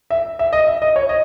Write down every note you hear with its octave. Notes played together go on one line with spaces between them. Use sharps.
E5
E5
D#5
E5
D#5
C#5
D#5